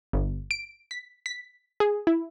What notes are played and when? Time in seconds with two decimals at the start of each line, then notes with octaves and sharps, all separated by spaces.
0.13 G1
0.51 D7
0.91 B6
1.26 B6
1.80 G#4
2.07 E4